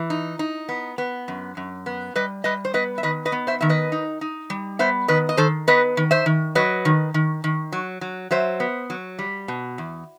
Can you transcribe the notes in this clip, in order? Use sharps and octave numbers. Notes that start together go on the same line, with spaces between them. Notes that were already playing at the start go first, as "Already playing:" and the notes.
Already playing: E3
D#4
D#4
B3
B3
F#2
F#2
B3
G3 B4 D#5
G3 B4 D#5
C5
B3 B4 D#5
E5
D#3 B4 D#5
B4 D#5
B3
C5 E5
D#3 E5
B4 D#5
D#4
D#4
G3
B3 C5 E5
D#3 B4 D#5
D#5
D#3 A4 C5
B3 B4 D#5
D#3
C5 E5
D#3
F#3 B4 D#5
D#3
D#3
D#3
F#3
F#3
F#3 C5 E5
B3
F#3
G3
B2
E2